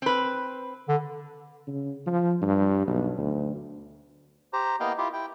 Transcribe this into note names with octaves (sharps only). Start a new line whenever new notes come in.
C4 B4
D3
C#3
F3
G2
B1
D2
G4 C5 A#5
A#3 B3 E4 D#5 F5 G5
E4 F4 G4
E4 G5